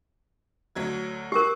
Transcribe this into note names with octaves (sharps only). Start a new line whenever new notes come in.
D2 F#3 G#6
G4 A#4 C#6 D6 F#6